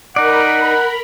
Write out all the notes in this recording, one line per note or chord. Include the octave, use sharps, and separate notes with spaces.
D#4 A#4 D5 F#5 B5